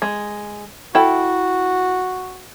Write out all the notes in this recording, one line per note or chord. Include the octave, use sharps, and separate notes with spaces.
G#3
E4 F#4 A4 G5